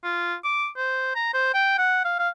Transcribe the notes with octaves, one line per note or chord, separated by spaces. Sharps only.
F4
D6
C5
A#5
C5
G5
F#5
F5
F5